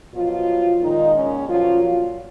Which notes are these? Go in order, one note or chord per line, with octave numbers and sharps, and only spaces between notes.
B2 F3 F#3 F4
A#2 D#3 G#3 D#4
C#3 C#4
A#2 F3 F#3 F4